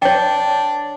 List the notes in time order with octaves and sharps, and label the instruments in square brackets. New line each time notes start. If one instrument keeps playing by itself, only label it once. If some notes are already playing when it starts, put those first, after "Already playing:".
[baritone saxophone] D4 [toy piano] C#5 G5